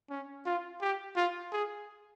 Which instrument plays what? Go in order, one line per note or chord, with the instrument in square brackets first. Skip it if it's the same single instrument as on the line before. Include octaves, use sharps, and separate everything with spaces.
[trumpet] C#4
F4
G4
F4
G#4